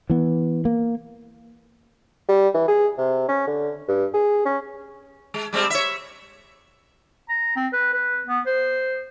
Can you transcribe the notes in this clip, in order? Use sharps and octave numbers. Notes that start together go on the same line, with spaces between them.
E3 B3
A#3
G3
E3
G#4
C3
C#4
D3
G2
G#4
C#4
G#3
G3 G#3 C4
C#5 E5
A#5
C4
B4
B4
B3
C5